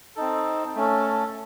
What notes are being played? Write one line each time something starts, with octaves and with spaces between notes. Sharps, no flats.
C4 D#4 A4
A3 C#4 A4